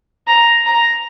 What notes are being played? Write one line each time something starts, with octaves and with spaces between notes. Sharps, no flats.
A#5
A#5